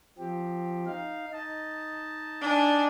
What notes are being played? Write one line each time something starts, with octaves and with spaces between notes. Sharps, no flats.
F3 C4 G4
D#4 F5
D#4 D#5 A5
D4 G#5